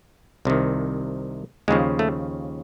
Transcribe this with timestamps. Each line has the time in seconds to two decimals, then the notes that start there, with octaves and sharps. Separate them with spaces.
0.45 C2 C3 D#3
1.68 D#2 C#3 F3 G#3
1.99 A3